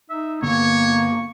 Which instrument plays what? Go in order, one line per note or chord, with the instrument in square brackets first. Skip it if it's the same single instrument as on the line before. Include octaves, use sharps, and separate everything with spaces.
[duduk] D#4 [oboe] E5
[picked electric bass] G2 D3 B3 [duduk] A#3 [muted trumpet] C#5 [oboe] C#6